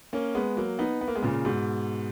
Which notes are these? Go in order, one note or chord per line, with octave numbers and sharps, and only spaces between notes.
A#3 C#4
G#3 B3
F#3 A#3
B3 D#4
B3
A#3
G#3 B3
A#2 C#3
G#2 B2